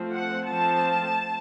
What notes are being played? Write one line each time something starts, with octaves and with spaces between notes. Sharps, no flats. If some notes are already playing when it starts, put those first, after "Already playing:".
Already playing: F3 A3 C4
F#5
F3 A3 C4 A5